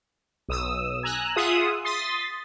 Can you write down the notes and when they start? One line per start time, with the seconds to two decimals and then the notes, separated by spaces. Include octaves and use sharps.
0.48 B1 D#6 E6
1.03 G#5 A#5 E6 F#6
1.36 F4 G#4 E5 F#5 D#6
1.84 C6 D#6 A6 B6